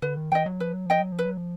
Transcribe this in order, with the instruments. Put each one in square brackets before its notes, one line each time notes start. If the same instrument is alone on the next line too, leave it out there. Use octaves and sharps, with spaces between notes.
[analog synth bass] D3 [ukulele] B4
[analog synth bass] D#3
[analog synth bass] E3 [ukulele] D#5 G5
[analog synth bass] F#3
[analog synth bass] F3 [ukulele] B4
[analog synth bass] F#3
[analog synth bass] F3 [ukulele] D#5 G5
[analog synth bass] F#3
F3
[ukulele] B4
[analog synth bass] F#3
F3